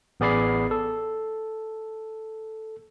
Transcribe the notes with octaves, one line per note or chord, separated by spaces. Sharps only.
A1 B3 G#4 D5 B5 C7
A4